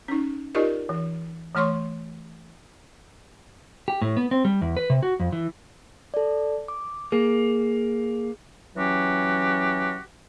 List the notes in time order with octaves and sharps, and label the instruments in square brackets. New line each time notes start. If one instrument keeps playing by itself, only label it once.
[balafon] C#4 D#4
D#4 F4 G4 A#4 D5 D#5
E3
E3 A3 C#5 C6 C#6
[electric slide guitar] G4
A2
B3
C4
G3
E2
B4
C3
F#4
F2
E3
[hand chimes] A4 D5
D6
[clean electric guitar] A#3 [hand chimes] G#4
[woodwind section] E3 F#3 C#4 F#4 G4